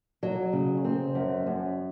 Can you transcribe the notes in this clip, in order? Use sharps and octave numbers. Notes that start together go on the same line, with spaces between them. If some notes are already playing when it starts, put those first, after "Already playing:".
F#3
C#3
C4
F#2
F#2